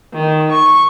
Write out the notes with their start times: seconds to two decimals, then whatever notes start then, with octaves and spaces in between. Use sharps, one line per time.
0.14 D#3
0.52 C#6